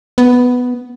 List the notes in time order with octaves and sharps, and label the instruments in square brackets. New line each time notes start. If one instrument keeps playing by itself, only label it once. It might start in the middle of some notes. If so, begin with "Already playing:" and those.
[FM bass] B3